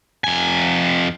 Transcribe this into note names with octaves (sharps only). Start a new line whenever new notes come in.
F2 G#5